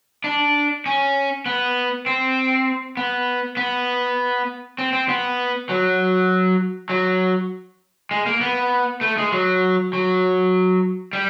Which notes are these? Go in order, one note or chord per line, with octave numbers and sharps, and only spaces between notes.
D4
C#4
B3
C4
B3
B3
C4
C4
B3
F#3
F#3
G#3
A#3
B3
A3
G#3
F#3
F#3
G3